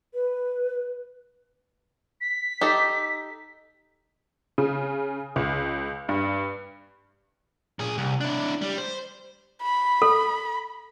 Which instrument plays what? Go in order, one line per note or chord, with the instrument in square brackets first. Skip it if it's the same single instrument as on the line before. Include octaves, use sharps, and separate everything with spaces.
[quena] B4
[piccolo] B6
[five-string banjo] D#4 G4 A4
[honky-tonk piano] C#3
C#2
G2
[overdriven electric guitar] A#2 G#4
C2
D4 E4
G3
C5
[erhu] B5
[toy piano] A4